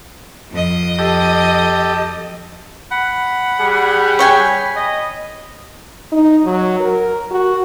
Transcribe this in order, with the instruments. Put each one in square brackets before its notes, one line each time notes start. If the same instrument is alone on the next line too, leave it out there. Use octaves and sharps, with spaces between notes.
[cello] F2 D#5
[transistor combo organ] G4 A4
[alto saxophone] F#5 [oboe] B5
[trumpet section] G3 G#4
[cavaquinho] C#5 G5 G#5
[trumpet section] D#5
[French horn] D#4
F#3
A#4
F#4